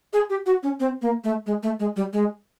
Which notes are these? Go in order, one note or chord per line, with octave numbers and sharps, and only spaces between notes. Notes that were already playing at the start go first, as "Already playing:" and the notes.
G#4
G4
F#4
C#4
C4
A#3
A3
G#3
A3
G#3
G3
G#3